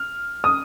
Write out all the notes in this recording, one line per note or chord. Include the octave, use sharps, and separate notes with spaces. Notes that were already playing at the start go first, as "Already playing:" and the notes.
Already playing: F6
D#6